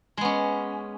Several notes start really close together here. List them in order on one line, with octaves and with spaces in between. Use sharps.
G#3 B3 C#4